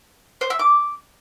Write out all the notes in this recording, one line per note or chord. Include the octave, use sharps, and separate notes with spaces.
C5
E5
D6